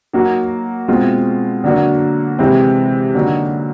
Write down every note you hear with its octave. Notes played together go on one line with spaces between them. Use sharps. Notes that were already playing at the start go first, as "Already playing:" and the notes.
F#3 A#3 D#4 F#4
B2 G#3 C4 F4
D3 F#3 A#3 D4 F#4
C3 E3 G#3 C4 E4
D3 F#3 A#3 D#4 F#4